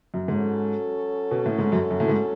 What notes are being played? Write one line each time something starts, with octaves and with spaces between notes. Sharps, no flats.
F#2
G#2 F#3 C#4 F#4 A4
B2
A2
G#2
F#2
F#2
A2
G#2